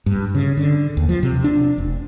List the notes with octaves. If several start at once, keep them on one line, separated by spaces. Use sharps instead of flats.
G2
C#3
D3
D#2
F3
C3
D4
F1